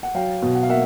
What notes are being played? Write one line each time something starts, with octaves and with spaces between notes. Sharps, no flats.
F#5
F#3 F5 G5
B2
F#5
F5
A#3 E5 F#5